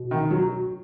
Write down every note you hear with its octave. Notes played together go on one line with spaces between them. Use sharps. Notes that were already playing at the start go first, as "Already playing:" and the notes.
Already playing: B2
D#3
F#3